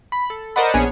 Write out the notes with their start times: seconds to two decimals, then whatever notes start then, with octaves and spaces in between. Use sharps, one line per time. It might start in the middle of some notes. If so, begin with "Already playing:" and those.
0.12 B5
0.30 A4
0.56 A#4 C5 D5 D#5 F#5 B5
0.74 A#1 B3 C#4 D4 G#4 C#5